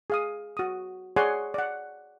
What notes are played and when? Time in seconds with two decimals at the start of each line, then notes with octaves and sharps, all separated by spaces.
0.10 G#4 F5 D#6
0.57 F#4 D#6
1.16 G#4 C#5 D5 F#5 G#5 C6
1.54 D5 F#5